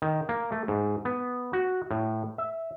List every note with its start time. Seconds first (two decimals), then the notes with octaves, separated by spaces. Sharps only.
0.02 D#3
0.29 A#3
0.52 A3
0.68 G#2
1.05 B3
1.53 F#4
1.91 A2
2.38 E5